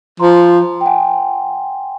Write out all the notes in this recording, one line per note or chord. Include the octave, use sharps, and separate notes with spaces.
F3 A#5 C6
G5
F#5 G#5